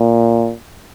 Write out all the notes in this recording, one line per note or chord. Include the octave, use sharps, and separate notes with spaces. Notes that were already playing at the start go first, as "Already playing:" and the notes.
Already playing: A#2